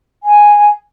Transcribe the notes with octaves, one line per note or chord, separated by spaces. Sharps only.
G#5